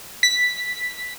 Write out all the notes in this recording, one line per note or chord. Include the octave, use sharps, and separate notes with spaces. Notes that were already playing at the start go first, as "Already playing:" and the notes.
B6